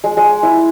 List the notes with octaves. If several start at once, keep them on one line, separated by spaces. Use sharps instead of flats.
G#3
G#3
E4